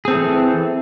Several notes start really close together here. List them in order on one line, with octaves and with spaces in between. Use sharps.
G#4 C4 A4 E3